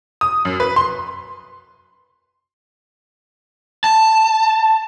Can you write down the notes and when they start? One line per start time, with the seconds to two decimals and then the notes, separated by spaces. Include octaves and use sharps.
0.21 D#6
0.45 F#2
0.60 B4
0.76 C6
3.84 A5